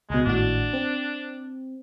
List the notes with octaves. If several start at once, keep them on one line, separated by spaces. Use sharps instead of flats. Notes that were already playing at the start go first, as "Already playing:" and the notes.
C#2 B2 G#3
G#1 A2 D4 F#4
C4